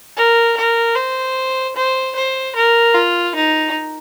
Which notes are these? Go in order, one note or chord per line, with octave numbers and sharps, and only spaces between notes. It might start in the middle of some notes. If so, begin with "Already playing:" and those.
A#4
A#4
C5
C5
C5
A#4
F4
D#4